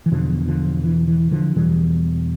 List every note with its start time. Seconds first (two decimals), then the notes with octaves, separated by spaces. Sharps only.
0.06 E3
0.11 E2 B2 D3 F3
0.48 D3 F3
0.84 E3
1.07 E3
1.31 D3 F3
1.55 E2 B2 E3 G3